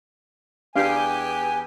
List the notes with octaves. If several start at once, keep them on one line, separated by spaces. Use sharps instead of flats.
E2 B3 D4 G4 F5 G#5